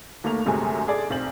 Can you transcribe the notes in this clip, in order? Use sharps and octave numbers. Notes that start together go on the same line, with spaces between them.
D#2 A3 A#3 F7
G1 F#2 C3 G#3 A3 G#5
G#4 A4 D5
B1 C4 F#7